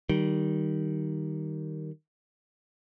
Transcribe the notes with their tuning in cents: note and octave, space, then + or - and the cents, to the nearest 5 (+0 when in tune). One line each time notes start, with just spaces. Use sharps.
D#3 +0 G3 -15